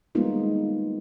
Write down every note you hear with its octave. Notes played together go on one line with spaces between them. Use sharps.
G3 G#3 A#3 B3 D#4 F4